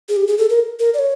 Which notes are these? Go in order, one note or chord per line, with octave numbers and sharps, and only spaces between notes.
G#4
G4
G#4
A4
A#4
A#4
D5
C#5